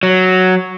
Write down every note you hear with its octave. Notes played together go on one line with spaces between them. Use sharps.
F#3